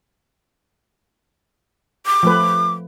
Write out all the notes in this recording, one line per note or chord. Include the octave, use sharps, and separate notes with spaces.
D6
F3 A3 B4